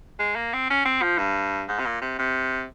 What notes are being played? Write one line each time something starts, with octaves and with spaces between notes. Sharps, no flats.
G#3
A#3
C4
C#4
C4
F3
G2
G#2
C3
A#2
C3
C3